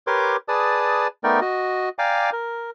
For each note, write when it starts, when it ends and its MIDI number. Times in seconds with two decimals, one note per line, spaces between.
0.07 0.36 67
0.07 0.36 70
0.07 0.36 71
0.07 0.36 73
0.07 0.36 84
0.07 0.36 86
0.48 1.07 68
0.48 1.07 71
0.48 1.07 74
0.48 1.07 81
0.48 1.07 87
1.24 1.40 57
1.24 1.40 59
1.24 1.40 63
1.24 1.40 70
1.24 1.40 74
1.24 1.40 79
1.41 1.89 66
1.41 1.89 75
1.99 2.30 74
1.99 2.30 77
1.99 2.30 79
1.99 2.30 80
1.99 2.30 82
1.99 2.30 86
2.33 2.70 70